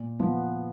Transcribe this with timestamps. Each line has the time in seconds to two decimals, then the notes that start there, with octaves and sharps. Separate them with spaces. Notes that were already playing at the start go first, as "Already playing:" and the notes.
Already playing: A#2
0.20 F3 B3